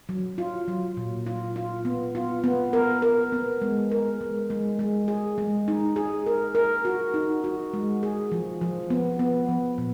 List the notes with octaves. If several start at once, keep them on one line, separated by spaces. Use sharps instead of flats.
F#3
F4
F#3
A#2
F4
F4
B3
F4
B3
A#4
A#4
B3
G#3
A#4
G#3
G#3
G#3
G#4
G#3
D#4
G#4
A#4
A#4
F#4
D#4
F#4
G#3
G#4
F3
F3
B3
B3
F3
A#2